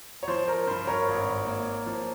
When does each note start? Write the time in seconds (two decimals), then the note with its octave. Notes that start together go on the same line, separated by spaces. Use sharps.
0.23 C#5
0.28 F3 C5
0.48 A#4
0.67 G2 C5
0.87 A#4 C#5
1.08 G#1
1.46 A#3
1.86 F3